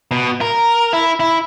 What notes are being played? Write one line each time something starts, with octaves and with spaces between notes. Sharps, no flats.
B2
A#4
E4
E4